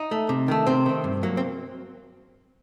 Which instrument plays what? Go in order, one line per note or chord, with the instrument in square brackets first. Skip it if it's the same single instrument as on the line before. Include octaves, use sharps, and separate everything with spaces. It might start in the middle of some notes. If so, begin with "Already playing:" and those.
Already playing: [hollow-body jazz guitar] D#4
A3
C3
D#3 A3
C3 C4
D#3 A3
G2
F#3 A#3
C4